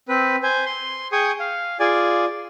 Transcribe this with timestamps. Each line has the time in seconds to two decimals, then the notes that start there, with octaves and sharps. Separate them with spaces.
0.09 C4 B4
0.43 C5 G#5
0.66 C6
1.12 G#4 G5 G#5 C#6 D#6
1.40 F5
1.80 F4 G#4 D5 G#5